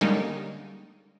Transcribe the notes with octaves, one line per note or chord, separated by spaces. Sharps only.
D3 G3 G#3 A#3 C#4 D#4